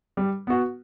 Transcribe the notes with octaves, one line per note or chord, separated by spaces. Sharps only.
G3
B3 F#4